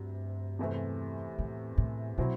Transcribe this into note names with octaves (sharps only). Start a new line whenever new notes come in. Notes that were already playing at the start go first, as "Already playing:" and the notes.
Already playing: D2 G2 C3
E2 C3 E3 A3 C4
A2
A2
B2 F#3 C4 E4